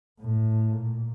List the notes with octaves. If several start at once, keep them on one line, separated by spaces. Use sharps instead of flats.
A2
A#2